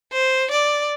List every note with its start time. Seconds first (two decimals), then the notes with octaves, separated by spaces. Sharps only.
0.12 C5
0.51 D5